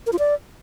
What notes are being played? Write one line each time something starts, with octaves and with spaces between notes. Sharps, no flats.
A#4
F4
D5